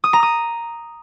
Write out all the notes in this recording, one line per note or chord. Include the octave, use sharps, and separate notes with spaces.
D#6
A#5
D#6